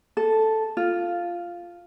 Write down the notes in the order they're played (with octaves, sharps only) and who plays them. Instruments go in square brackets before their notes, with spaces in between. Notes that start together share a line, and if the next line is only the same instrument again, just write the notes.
[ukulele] A4
F4